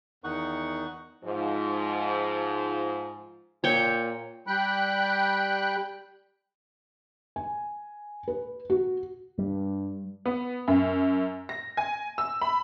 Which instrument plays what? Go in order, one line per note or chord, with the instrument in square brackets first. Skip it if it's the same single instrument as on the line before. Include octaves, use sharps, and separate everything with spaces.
[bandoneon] E2 D#3 D#4 F#5 C#6
[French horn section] G#2 F3
[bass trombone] A#2 [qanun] C#5 G5
[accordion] G3 G5 B5 F#6
[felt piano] G#5
B4
F#4
[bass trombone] G2 [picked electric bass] G3
[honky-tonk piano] B3
F#2
A#6
G#5
E6
B5